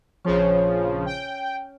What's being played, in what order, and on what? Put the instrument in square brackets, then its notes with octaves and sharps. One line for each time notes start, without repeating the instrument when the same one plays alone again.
[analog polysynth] A#1 C#3 F3 [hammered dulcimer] C#4
[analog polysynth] G5